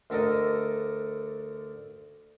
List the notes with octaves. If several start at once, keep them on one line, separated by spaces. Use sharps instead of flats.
D2 D3 A4 A#4 D#5